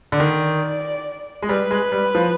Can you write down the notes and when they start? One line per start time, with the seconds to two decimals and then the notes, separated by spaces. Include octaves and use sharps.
0.12 D3
0.19 D#3 D5
1.43 G#3
1.49 G3 B4
1.71 G#3
1.92 G3
2.15 F3